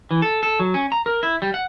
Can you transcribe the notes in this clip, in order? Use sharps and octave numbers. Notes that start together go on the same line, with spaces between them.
E3
A4
A4
F#3
C#4
A#5
A#4
E4
G3
F#5